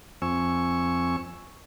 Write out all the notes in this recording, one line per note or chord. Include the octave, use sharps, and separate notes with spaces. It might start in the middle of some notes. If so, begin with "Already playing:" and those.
F2 C4 G#5 C#6 E6